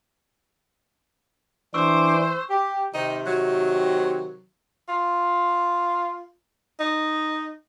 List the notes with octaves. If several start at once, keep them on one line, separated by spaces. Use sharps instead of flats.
E3 D4 C5 C#6 D6 E6
G4
C3 D#3 D#4
F#3
F4
D#4